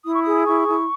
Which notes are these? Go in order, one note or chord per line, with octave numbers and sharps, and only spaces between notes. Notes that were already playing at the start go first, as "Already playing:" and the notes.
E4 D#6
C#6
G#4 D#6
E4 C#6
E4